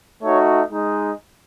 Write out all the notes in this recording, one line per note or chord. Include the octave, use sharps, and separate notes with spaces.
A3 D#4 F#4 C#5
G#3 D#4